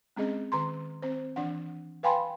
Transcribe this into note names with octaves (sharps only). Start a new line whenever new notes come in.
G#3 C4 C#4 G#4 D#5
D#3 A#5 C6
C4 C5
E3 D4 F#5
B4 F5 G5 G#5 B5 C6